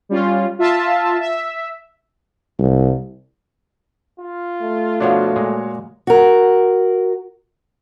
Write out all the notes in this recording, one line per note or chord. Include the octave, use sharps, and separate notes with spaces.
G3 C#4 F4
F4 E5 A5
E5
C2
F4
A3
B2 F3 D4 F#4 C#5 F5
A#2 G#3
F#4 A#4